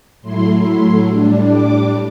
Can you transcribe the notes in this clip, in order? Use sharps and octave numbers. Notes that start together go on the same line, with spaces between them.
A2 F#3 A3 E4 C6
C6
A2 G3 D4
D6